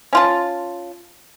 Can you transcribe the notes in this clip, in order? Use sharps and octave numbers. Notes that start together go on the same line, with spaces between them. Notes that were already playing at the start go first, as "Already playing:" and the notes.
C#4 F4 A5